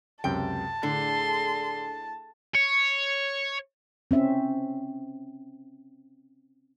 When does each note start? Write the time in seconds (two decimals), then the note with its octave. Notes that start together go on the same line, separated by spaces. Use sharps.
0.24 C#2 F#2 C3 G5 A5
0.83 A2 D3 G#4 C6
2.55 C#5
4.11 C4 C#4 E5